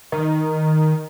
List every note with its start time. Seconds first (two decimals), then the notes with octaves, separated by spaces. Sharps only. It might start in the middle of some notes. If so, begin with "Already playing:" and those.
0.12 D#3